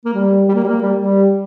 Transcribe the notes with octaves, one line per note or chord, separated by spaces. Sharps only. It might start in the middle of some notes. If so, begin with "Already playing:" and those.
A#3
G3
G3
A#3
G3
A#3
G3
G3